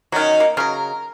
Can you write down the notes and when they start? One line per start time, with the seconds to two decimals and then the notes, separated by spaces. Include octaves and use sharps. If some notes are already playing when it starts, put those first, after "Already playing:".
0.12 D#3 F#3 C#4 D#4 F#4
0.40 A#3
0.57 C#3 F#3 A#4